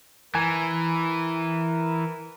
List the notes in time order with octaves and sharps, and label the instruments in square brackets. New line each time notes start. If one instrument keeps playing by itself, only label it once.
[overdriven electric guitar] E3 [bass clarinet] A#4 [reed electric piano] G#5